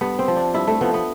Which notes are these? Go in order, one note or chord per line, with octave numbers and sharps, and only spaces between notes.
G2 B3
C4
F3
D4
G2 E4
A3
F3 B3
B3